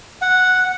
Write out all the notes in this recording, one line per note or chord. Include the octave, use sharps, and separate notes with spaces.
F#5